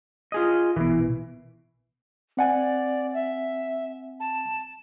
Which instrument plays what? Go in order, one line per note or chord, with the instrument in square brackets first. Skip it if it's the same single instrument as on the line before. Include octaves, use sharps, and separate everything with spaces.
[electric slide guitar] F4 G#4 D#5
[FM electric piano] A#1 B2 [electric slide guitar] E3
[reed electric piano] C4 F#5 G#5 [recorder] D5
[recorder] E5
A5